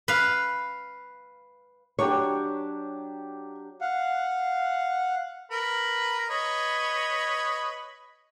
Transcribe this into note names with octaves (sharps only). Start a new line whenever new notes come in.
B4 F5
F#3 D4 G4 C#5
F5 F#5
A#4 B4
B4 C#5 D#5